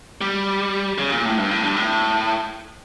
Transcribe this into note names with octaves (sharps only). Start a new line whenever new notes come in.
G3
C#3
A#2
A2
G2
A2
G2
A2